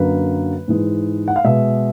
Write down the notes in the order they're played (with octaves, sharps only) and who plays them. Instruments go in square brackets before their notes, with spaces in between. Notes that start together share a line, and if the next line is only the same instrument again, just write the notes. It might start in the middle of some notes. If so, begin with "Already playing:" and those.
Already playing: [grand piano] F#2 D3 F#3 A#3 B4
G#2 E3 G#3
F#5
F5
B2 G#3 E5